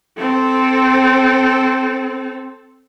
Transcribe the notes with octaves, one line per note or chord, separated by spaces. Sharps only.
C4 A4